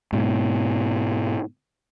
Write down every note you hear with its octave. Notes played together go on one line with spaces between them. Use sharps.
G#2 B2